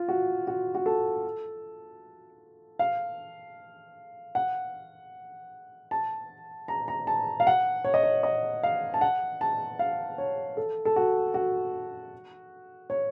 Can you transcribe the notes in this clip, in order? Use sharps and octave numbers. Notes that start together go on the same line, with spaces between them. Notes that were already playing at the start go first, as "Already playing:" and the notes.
Already playing: F4
F#4
F#4
F#4
A4
F5
F#5
A5
A#5
A#5
A5
F5
F#5
C#5
D#5
C#5
D#5
F5
A5
F#5
A5
F5
C#5
A4
A4
F#4
F#4
C#5